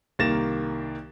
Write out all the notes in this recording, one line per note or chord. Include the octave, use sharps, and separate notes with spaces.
C2 D#3 A#3 A6 A#6 E7